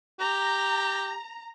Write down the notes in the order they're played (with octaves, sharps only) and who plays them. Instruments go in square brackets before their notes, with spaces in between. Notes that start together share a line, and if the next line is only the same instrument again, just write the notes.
[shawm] G4 [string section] A#5